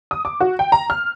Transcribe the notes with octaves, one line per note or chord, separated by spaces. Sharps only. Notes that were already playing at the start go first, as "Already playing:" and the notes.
D#6
D6
F#4
G5
A#5
F6